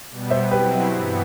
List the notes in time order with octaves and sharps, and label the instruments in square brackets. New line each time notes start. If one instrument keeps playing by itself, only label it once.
[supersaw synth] B2 G3 B3
[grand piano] C5 E5
[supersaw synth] B2 F#3 C4 E4 [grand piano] G4 B4
[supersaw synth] G2 E3 B3